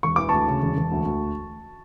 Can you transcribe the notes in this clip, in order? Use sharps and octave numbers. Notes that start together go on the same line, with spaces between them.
E1 C#6
E3 D6
D2 A5 C#6
C#3
E1
E1
D2
D2